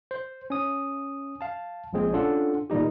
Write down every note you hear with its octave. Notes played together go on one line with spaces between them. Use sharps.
C5
C#4 D#6
F5 A5
A#1 A#2 G#3 C4 G#4
C#4 D4 F4 A4 F#5
A#2 D#3 G3 D#4 G4